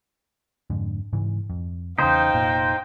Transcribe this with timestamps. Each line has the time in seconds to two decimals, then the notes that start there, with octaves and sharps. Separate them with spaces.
0.70 F2 G#2 D3
1.13 G#2 C#3 E3
1.50 F2
1.99 E2 C#3 D#4 C5 F5 G5
2.34 F1 A#2